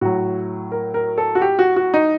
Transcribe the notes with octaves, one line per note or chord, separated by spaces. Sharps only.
A2 F#3 F#4
A#4
A#4
A4
F#4
G4
F#4
F#4
D#4